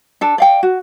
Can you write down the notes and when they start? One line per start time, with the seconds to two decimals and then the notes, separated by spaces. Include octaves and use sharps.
0.21 D4 A4
0.38 D5 F5 G5
0.63 F#4